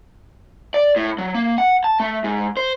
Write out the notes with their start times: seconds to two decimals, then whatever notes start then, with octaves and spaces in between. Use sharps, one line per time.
0.74 D5
0.96 A2
1.18 F#3
1.35 A#3
1.58 F#5
1.84 A5
2.00 A3
2.24 G#2
2.57 C5